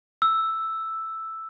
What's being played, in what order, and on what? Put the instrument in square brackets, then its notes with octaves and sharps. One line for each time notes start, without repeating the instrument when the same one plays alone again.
[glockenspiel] E6